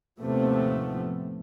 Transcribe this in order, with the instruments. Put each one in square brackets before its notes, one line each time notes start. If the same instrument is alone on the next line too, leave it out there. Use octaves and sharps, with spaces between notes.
[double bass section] D#2 A2 C3 F3 A3 B3